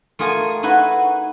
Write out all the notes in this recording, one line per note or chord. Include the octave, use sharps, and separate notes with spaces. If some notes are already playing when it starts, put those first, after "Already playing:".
A3 F4 G#4 A#4 G#5
D#4 E4 F#4 G#4 B4